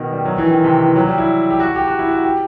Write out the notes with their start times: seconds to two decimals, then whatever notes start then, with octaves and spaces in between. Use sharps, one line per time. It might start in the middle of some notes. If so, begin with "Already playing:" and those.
Already playing: B2 D#3
0.12 G3
0.25 F#3
0.38 E3
0.51 D#3
0.64 C3
0.80 E3
0.96 F#3
1.07 G3
1.18 E4
1.50 G4
1.60 F#4
1.76 G4
1.88 F#4
1.99 E4
2.11 F#4
2.24 G4